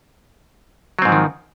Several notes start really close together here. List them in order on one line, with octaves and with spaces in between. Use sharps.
F#3 C4 G#2 F3 D#3